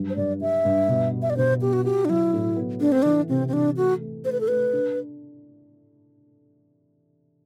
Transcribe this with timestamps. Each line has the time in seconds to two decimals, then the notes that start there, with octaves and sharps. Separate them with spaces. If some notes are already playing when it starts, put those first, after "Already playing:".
Already playing: G2 F#3
0.10 C5
0.16 G2 D5
0.41 G3 E5
0.65 G2
0.88 B2
1.12 G3
1.22 E5
1.30 D5
1.37 B2 C5
1.61 B3 G4
1.73 F#4
1.85 F#4 G4
2.05 D4
2.09 F#3 E4
2.34 A2
2.57 B3
2.80 A3 D4
2.92 C4
3.02 E3 D4
3.29 C3 C4
3.48 C4
3.53 E3 D4
3.77 A3 F#4
4.00 A3
4.25 A3 C5
4.32 B4
4.40 A4
4.48 A3 B4
4.73 D4